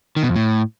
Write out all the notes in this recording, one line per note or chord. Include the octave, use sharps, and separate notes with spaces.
D#3
B2
F2
A2